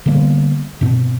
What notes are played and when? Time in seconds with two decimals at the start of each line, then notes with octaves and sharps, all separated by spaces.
0.06 D3 G3 A#3 B3
0.81 G2 B2 C4